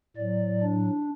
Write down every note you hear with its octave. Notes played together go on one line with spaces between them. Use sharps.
A2 F#3 D5
D4